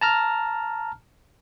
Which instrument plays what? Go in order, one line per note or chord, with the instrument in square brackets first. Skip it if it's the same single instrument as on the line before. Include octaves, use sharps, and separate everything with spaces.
[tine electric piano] A5 A#5 F6